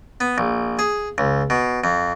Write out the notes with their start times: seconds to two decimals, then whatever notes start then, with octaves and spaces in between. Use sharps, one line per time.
0.21 B3
0.38 A#1
0.79 G#4
1.18 C#2
1.50 B2
1.84 F2